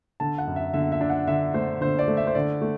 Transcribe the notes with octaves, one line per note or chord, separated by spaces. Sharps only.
D3 A5
F#5
F#2
E5
D3 E5
E5
D4
F#5
D3 E5
A3 C5
D3 C5
D5
A3
E5
C5
D3 D5
A3